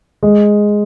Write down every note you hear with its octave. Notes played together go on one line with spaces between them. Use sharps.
G#3